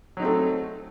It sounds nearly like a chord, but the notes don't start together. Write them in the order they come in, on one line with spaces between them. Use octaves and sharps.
F#3 D#4 C4 A3